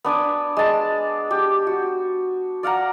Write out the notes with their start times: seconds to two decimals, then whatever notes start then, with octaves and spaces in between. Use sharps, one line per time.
0.04 B3 D4 D5 G#5
0.57 G#3 A5
1.31 G4
1.67 F#4
2.63 D5 F5 F#5 A#5